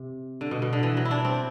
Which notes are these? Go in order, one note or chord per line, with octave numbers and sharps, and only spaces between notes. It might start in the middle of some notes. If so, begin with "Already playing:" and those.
Already playing: C3
D3
B2
B2
D3
E3
F#3
E4
D4
C4